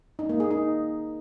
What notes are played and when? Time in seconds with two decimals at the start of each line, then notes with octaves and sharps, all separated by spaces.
0.19 D#4
0.29 A#3
0.40 G#4
0.51 D#4